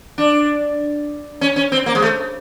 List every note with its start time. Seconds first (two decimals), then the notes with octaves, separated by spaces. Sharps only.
0.18 D4
1.41 C#4
1.56 C#4
1.72 C4
1.86 A#3
1.95 G#3
2.02 A3